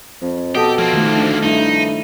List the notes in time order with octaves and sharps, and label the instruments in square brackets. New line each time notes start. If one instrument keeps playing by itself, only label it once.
[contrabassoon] F2
[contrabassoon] B2 [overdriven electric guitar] G4 [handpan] A4 D#5
[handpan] F3 [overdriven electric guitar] A#3 C4
[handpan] D#3 A3
[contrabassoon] D2
[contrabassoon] G2 [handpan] A3 E4 [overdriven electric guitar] D#4